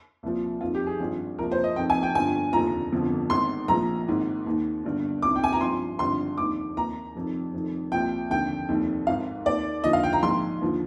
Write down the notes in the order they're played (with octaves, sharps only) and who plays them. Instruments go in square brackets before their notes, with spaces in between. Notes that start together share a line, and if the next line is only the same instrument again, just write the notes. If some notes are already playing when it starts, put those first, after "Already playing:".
[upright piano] C2 A#2 F3
F1 F2 D#3 F4
G4
G#4
G#1 G2 F3
C2 A#2 F3 A#4
C5
D#5
F1 F2 D#3 G5
G#5
G5
G1 G2 D3 F3 G#5
F1 D#2 D3 F3 A#5
G1 F2 D3 F3
G#1 G#2 D#3 C6
A#1 A#2 F3 A#5
G#1 G#2 D#3
D#2 D#3
G1 G2 D3
C2 C3 D#3 D6
G5
G#5
A#5
G#1 G2 F3 C6
G#1 G2 D3 F3 C6
F1 D#2 D#3 D6
D#2 D#3 A#5
F1 F2 D#3
F1 F2 D#3
C2 A#2 F3 G5
F1 D#2 D3 G5
F1 D#2 D#3
G#1 G#2 D#3 F5
D#2 D#3 D5
D#2 D3 F3 D#5
F5
G5
A#5
A#1 G#2 D#3 C6
D#2 D3 F3